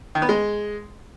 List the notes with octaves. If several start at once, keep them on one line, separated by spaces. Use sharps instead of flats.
D#3
B3
G#3